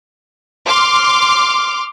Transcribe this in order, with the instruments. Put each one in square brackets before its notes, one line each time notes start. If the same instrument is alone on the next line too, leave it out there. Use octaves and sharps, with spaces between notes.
[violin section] C6 D6 F6